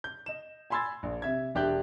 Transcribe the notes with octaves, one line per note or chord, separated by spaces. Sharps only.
G6
D#5 E7
G#5 B5 C6 E6 G#6 A6
A#1
C3 E5 G#6
E1 D4 G4 E5 F#6 G6